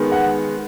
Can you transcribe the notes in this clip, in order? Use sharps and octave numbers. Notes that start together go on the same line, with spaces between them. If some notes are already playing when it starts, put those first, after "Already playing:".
Already playing: D#3 G#3 B3
F#5